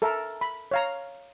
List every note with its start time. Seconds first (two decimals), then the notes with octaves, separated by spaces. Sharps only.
0.02 A4 A#4 E5
0.41 B5
0.71 C#5 F5 A#5